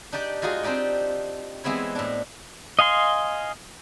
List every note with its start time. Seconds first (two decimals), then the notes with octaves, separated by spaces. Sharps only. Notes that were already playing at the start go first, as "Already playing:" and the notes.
0.12 D4 D#4 G4 D5 G5
0.42 G#3 D#4 F4 F#4 G#4
0.63 C4 D4 D#4 G4 D5
1.64 E3 G#3 B3 C4 E4 C#5
1.95 A2 D4
2.79 D#5 F5 G#5 C6